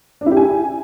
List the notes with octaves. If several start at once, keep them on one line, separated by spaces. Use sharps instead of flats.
D4
E4
G4
G#5